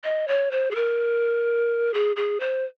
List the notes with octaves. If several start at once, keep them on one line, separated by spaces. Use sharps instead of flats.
D#5
C#5
C5
G#4
A#4
G#4
G#4
C5